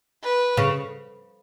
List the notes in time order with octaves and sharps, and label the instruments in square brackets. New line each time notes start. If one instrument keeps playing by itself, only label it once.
[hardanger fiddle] B4
[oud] C#3